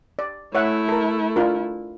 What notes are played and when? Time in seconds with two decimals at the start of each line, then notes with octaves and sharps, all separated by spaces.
0.19 D5
0.55 A3 E4 C#5 E5 F#5
0.89 A4 A#4
1.36 D4 F4 A#4